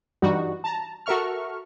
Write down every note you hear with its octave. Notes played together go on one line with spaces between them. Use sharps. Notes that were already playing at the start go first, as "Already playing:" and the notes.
G2 E3 G3 D#4 F#4
A5 A#5
F#4 A4 A#4 E5 C#6 F6